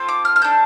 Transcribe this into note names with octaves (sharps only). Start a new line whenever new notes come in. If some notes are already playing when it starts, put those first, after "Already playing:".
Already playing: C4 F4 A4
D6
F6
F6
D4 A4 G6